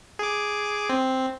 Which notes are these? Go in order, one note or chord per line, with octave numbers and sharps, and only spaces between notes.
G#4 D6
C4